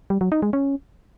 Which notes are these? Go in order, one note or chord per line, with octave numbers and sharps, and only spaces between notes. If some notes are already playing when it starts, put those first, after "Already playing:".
G3
F#3
D#4
G#3
C#4